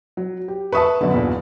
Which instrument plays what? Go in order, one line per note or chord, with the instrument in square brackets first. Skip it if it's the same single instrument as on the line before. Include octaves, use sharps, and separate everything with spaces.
[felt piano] F#3
G4
[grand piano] B4 E5 A5 [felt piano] B5 C#6 D#6
[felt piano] F#2 B2 D3
G1 E2 A#2